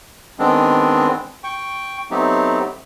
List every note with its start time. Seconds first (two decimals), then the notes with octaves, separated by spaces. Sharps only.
0.39 D#3 G#3 B3 C4 D4
1.44 G5 C#6
2.11 F#3 A3 B3 C4 D#4 G4